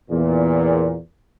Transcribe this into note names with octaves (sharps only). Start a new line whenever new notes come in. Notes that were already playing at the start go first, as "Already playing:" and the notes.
E2 A#2